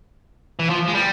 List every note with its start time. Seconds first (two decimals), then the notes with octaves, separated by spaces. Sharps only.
0.59 E3
0.70 F3
0.88 G#3
0.95 G3